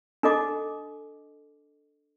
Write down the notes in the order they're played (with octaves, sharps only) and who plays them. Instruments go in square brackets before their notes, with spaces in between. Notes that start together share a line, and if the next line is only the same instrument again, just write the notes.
[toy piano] D4 A4 D#5 D6